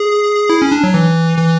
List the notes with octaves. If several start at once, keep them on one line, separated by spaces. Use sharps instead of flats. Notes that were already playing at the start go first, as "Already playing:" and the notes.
Already playing: G#4
E4
C#4
D4
F#3
E3
E3